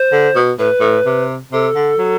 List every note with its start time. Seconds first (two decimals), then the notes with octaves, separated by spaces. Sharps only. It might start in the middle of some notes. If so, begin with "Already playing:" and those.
Already playing: C5
0.12 D3
0.35 B2
0.59 A2 B4
0.80 A2
1.06 C3
1.52 C3 A4
1.75 D3
1.99 F#3